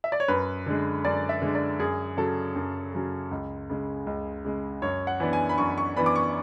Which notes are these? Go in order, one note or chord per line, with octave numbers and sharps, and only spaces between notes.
E5
D5
C#5
F#2 B4
D3 G#3
F#2 D5
E5
D3 G#3
D5
F#2 G#4
C#3 F#3 C#4 A4
F#2
C#3 F#3 C#4
C#2
C#3 G#3
C#2
C#3 G#3
F#2 C#5
F#5
E3 B3 D4
G#5
B5
F#2 C#6
C#6
E3 B3 D4 B5
D6
C#6